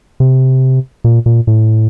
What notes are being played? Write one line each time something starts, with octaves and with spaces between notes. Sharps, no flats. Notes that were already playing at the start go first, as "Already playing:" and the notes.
C3
A#2
A#2
A2